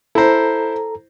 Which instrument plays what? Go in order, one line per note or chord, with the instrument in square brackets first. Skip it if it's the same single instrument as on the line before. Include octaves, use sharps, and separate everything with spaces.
[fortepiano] E4 C5 [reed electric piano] A4 A#5